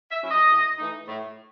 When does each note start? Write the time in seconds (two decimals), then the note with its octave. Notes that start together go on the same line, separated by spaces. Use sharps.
0.11 E5
0.21 F#3 C#4 E4
0.31 D#5
0.50 A2
0.79 E3 A3 D#4
1.08 A2